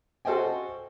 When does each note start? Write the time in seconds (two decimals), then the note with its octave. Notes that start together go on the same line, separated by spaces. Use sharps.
0.25 F#4 A4 C5 D#5 G5 G#5